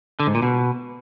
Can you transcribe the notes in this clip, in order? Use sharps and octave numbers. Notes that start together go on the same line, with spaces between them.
D3
G#2
A#2
B2